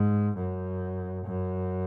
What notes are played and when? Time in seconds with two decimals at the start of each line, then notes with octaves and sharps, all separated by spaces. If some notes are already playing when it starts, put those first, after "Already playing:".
Already playing: G#2
0.38 F#2
1.26 F#2